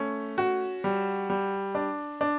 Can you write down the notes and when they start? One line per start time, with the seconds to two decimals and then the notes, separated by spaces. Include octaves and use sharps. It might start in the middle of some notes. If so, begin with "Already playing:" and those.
Already playing: A3 C#4
0.38 F#4
0.84 G3
1.30 G3
1.75 D4
2.21 D4